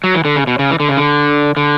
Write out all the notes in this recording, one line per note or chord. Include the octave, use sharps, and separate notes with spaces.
F#3
E3
D3
C#3
B2
C#3
E3
D3
C#3
D3
D3